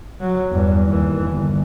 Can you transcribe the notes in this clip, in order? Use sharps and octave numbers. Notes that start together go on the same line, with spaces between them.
F#3
E2 G2
D#2 E3
G1